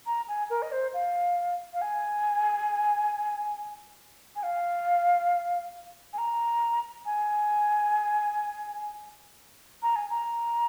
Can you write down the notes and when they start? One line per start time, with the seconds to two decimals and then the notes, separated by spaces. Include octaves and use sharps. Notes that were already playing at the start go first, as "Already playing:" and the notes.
0.06 A#5
0.28 G#5
0.50 A#4
0.62 D#5
0.72 C5
0.94 F5
1.74 F5
1.81 G#5
4.36 G#5
4.43 F5
6.13 G#5
6.18 A#5
7.06 G#5
9.82 A#5
9.96 G#5
10.10 A#5